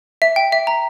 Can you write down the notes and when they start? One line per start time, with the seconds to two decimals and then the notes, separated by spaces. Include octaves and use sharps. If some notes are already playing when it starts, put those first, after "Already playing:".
0.22 E5
0.36 G5
0.52 E5
0.67 A#5